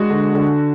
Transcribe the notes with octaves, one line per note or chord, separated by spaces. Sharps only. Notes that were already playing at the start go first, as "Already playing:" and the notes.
Already playing: G#3 D4 F#4
D3
D3